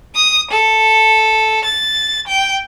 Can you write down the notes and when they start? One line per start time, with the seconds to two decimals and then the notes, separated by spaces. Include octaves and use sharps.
0.16 D#6
0.51 A4
1.65 A6
2.27 G5